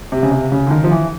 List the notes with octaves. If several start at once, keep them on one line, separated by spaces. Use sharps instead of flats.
C3
C#3
C3
C#3
D3
D#3
F3
E3